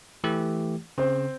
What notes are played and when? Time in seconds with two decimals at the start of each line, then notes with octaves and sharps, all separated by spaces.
0.24 E3 A3 G4
0.98 C#3 C4 C5